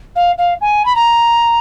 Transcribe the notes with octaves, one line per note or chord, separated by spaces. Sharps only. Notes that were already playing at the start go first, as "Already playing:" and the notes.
F5
F5
G#5
B5
A#5